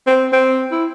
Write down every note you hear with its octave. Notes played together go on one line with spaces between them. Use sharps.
C4
C4
E4